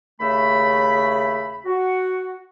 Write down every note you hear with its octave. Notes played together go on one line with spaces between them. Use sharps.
D#2 C#3 A3 E5 B5
F#4